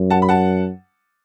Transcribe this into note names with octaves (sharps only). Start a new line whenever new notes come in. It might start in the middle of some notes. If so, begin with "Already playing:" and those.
Already playing: F#2
F#5 A5
B5
F#5 A5